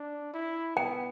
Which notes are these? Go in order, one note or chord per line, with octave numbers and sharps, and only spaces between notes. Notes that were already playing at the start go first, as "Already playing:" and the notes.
Already playing: D4
E4
B3 G5